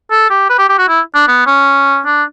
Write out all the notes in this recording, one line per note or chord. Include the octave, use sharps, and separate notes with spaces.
A4
G4
B4
G4
G4
F#4
E4
D4
B3
C#4
D4